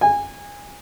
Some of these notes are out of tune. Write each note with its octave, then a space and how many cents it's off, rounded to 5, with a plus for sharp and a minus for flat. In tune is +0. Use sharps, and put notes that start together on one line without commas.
G#5 -20